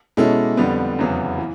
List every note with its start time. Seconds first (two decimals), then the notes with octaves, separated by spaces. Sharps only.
0.17 B2 G#3 C#4 E4 A4
0.57 F2 D3 G3 B3
0.99 F1 E2 C#3 F#3 B3
1.38 E3